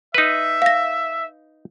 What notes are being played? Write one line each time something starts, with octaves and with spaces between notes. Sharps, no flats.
D#4 B4 E5
F5 A#6